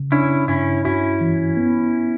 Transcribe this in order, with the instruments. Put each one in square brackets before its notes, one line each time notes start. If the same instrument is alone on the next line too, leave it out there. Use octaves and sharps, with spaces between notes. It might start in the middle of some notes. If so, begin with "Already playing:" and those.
Already playing: [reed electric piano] C#3
[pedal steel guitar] C#4 E4 [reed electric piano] D4
[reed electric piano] G2 [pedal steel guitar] C#4 E4
[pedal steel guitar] C#4 E4 [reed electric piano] F#4
[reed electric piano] E3
B3